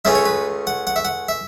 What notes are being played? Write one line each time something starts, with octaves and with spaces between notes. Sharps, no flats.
C#2 C#3 A3 C#4 E5
C#5
B4
F#5
F#5
E5
F#5
E5